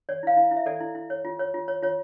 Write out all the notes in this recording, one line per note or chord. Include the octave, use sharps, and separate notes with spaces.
C#5 D5
E4 F5
E4
E4
E5
A4 D5
E4
E4
C#5
F4
C#5
F4
C#5
F4 C#5